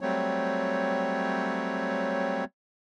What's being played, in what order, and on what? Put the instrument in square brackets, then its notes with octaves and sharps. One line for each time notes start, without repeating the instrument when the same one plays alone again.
[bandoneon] F#3 G3 A3 C4 C#5